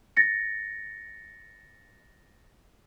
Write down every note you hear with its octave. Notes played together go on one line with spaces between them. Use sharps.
A6 A#6 C#7